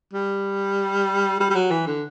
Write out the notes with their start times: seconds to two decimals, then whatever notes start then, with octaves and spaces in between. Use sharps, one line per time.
0.13 G3
1.40 G3
1.50 G3
1.55 F#3
1.71 E3
1.87 D3